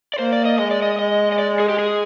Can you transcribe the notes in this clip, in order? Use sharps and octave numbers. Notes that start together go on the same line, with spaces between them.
D5
A#3 C5
D5
D#5
G#3 D#5
D5
D#5
G#3 D#5
D#5
D5
G#4
G4
G#4